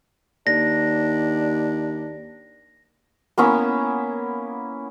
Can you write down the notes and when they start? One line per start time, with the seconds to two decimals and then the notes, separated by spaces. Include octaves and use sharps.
0.47 D#2 D4 A#6
3.38 A#3 B3 C#4 E4